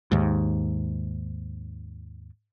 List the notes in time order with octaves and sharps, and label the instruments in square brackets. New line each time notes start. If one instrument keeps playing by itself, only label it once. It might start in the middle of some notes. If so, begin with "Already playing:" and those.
[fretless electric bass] D#2 G#2